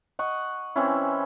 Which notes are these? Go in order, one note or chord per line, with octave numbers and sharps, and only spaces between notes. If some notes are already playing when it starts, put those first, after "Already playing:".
D#5 F#5 C#6
E3 C4 C#4 E4